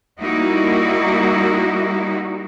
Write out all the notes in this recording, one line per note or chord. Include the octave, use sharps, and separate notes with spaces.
G3 A#3 D#4 E4 F#4